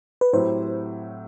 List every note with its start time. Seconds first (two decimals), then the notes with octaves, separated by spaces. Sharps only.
0.21 B4
0.33 A2 F#3 C4 E4 G4 C5